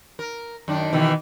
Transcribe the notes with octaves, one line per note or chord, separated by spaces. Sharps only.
A#4
F#2 D#3 D4
B2 D#3 E3